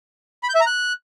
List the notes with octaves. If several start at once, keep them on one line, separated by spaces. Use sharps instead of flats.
B5
G6
E5
A#5
F#6